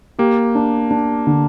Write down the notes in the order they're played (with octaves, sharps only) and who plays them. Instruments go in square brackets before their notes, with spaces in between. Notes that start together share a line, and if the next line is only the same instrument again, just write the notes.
[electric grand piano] A#3 [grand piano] G4
[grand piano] D4
D4
D3